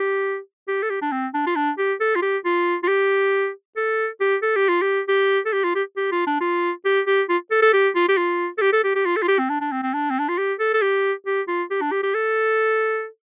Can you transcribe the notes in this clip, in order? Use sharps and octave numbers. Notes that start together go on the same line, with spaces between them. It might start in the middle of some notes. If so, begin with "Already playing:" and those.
Already playing: G4
G4
A4
G4
D4
C4
D4
F4
D4
G4
A4
F4
G4
F4
F4
G4
A4
G4
A4
G4
F4
G4
G4
A4
G4
F4
G4
G4
F4
D4
F4
G4
G4
F4
A4
A4
G4
F4
G4
F4
A4
G4
A4
G4
G4
F4
A4
F4
G4
C4
D4
D4
C4
C4
D4
C4
D4
F4
G4
A4
A4
G4
G4
F4
G4
D4
G4
G4
A4